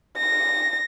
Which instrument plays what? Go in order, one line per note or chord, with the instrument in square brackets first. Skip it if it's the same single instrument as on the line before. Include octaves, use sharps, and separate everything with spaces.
[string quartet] A#6